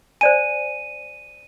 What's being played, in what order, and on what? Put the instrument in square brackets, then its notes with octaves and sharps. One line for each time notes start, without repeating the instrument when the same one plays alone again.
[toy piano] C5 D5 G#5 [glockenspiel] D#7